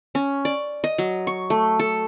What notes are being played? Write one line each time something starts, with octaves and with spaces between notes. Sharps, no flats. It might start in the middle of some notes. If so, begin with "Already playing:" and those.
C#4
D5
D#5
F#3
C#6
A3
A4